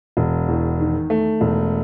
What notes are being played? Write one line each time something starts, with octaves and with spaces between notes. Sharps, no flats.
E1
E2
D#3
A3
E1